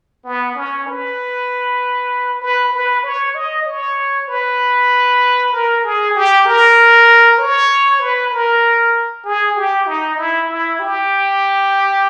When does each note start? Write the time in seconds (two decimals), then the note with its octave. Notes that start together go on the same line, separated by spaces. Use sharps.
0.25 B3
0.55 C#4
0.87 B4
2.42 B4
2.73 B4
3.04 C#5
3.35 D#5
3.66 C#5
4.28 B4
5.52 A#4
5.84 G#4
6.15 G4
6.46 A#4
7.38 C#5
8.00 B4
8.32 A#4
9.25 G#4
9.56 G4
9.87 D#4
10.18 E4
10.48 E4
10.80 G4